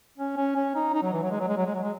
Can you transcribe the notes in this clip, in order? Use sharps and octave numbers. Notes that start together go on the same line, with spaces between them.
C#4
C#4
C#4
D#4
D#4
F#3
E3
F#3
G#3
F#3
G#3
F#3
G#3
F#3
G#3